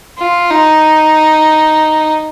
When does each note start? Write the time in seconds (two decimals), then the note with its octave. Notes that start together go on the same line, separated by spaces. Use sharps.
0.19 F4
0.50 D#4